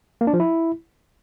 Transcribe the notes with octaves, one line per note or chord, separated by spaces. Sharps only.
A#3
D4
F3
E4